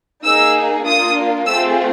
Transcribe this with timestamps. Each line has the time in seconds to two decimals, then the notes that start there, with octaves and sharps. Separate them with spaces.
0.23 A#3 D#4 G#4 E6
0.85 A#3 D4 F4 D#6
1.46 A3 C4 F4 G#4 E6